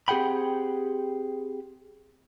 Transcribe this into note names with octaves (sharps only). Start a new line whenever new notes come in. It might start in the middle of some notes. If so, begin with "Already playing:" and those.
C4 G4 G#4 F#5 G5 B5